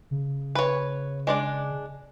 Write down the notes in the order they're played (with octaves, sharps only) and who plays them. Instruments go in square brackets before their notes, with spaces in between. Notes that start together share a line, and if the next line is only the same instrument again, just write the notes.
[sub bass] C#3
[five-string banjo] B4 C#5
G#3 D4 D5